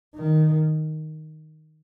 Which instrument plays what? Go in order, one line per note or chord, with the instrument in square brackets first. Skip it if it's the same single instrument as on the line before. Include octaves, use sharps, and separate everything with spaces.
[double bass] D#3